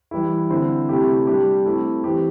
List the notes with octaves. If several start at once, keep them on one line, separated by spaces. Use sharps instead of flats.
E3 G3 E4
D3 C4 E4 C5
C3 A3 E4 G4
G3 D4 G4
A3 C4 E4
E3 C4 G4